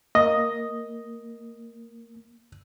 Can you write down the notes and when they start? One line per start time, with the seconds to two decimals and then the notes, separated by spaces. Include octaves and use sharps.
0.15 A#3 D#5